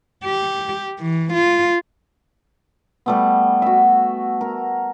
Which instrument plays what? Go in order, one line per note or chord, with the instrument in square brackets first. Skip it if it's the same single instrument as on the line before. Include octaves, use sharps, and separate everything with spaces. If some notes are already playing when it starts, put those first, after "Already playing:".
[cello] G4
E3
F4
[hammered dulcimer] G3 A3 B3
F#4 E5
A#4